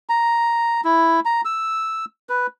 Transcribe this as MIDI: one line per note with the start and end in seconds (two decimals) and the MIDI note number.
0.09 0.81 82
0.85 1.20 64
1.25 1.41 82
1.45 2.05 88
2.29 2.47 71